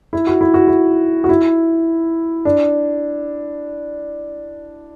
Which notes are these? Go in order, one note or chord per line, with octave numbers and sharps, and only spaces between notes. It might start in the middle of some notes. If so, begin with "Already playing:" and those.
E4
F#4
E4
F#4
E4
F#4
E4
D4